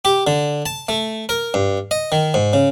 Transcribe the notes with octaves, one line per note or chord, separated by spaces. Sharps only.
G4
D3
A5
A3
A#4
G2
D#5
D#3
G#2
C#3